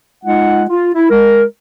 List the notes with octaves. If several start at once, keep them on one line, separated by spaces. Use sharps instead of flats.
G#3 D#4 F4 F#5
F4
E4
G#3 A#4